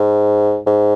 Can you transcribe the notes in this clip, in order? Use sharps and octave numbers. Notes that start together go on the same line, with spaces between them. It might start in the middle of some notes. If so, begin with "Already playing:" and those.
Already playing: G#2
G#2